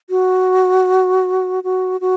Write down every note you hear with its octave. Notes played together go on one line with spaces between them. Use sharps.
F#4
F#4
F#4